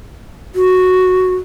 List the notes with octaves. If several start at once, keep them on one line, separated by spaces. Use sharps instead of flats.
F#4